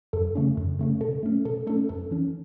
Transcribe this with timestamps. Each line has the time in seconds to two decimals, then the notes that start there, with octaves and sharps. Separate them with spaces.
0.13 F#2 A4
0.35 C#3 A3 C#4
0.57 F#2
0.79 C#3 A3 C#4
1.01 B2 A4
1.23 A3 C#4
1.45 B2 A4
1.67 A3 C#4 A4
1.89 F#2 A4
2.11 E3 C#4